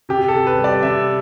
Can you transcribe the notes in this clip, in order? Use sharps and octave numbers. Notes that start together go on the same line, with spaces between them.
C3 G4
A4
C3
B4
G3
D5
C3 E5